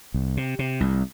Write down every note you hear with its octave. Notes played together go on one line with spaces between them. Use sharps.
C2
C3
C3
C2